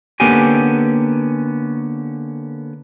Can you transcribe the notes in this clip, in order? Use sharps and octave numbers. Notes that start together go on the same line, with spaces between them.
D3 A#3 B3 C#4 G4 G#5